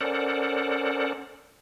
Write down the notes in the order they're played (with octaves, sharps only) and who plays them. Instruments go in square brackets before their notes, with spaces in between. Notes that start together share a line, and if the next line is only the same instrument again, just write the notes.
[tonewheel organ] C#4 A4 A#4 C5 D5 F#5